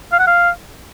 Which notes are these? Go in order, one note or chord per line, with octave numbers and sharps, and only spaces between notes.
F5
F#5
F5